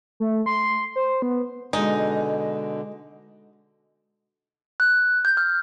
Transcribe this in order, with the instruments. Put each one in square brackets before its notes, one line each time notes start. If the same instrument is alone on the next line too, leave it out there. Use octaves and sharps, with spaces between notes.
[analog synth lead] A3
C6
C5
B3
[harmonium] B2 D3 [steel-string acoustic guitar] G#3 G#5 [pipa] D#4
[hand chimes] F#6
G6
F6